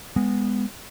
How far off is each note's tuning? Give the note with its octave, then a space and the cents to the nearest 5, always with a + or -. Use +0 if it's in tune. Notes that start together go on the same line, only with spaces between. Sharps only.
G#3 -25 B3 +0